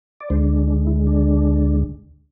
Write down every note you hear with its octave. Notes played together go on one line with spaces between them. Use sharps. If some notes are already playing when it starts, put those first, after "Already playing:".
D5
D2 D3 G#3 D4 C5
D4
E4
D4